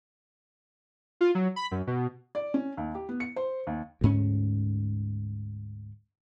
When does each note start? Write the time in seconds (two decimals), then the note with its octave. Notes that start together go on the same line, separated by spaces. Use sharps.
1.21 F4
1.35 F#3
1.56 B5
1.72 F#2
1.87 B2
2.35 D5
2.54 C#4
2.77 D#2
2.95 G4
3.09 B3
3.20 C#7
3.36 C5
3.67 D#2
4.01 D2 G#2 C#4